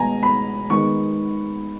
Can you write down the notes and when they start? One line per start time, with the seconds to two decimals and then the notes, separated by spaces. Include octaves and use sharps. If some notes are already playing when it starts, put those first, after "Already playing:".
Already playing: B2 G#3 B3 G#5 A#5
0.23 B5
0.70 D#3 G#3 B3 C#6